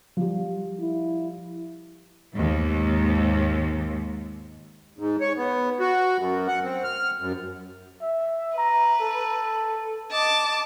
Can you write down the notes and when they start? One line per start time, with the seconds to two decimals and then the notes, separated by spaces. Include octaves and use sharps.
0.17 F3 G3
0.81 E4
2.33 D#2 G#2
4.98 G#2
5.21 C#5
5.37 B3
5.80 F#4
6.19 F#2
6.48 F#5
6.64 C4
6.84 F6
7.20 F#2
8.02 E5
8.58 B4 A#5
9.01 A4
10.12 D#5 A5 D6